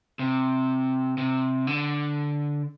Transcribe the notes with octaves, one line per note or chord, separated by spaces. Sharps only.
C3
C3
D3